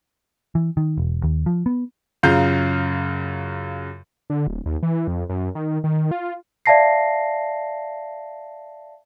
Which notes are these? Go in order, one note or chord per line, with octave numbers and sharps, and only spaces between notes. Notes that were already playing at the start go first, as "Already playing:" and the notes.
E3
D#3
E1
D#2
F3
B3
F#2 C#3 F4 F5 A#5 G6
D3
D1
D#2
E3
F2
F#2
D#3
D#3
F4
D5 E5 F5 A5 A#6 C7